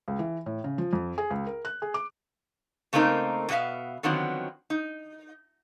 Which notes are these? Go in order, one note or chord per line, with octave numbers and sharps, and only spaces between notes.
C#2
E3
A2
C#3
F3
F2
G#4
C#2
A#4
F#6
G#4
D6
C#3 A3 A#3 C4 D#4 A#4
B2 B3 G4 E5 F5
D3 D#3 F3 F#3 B3 C4
D#4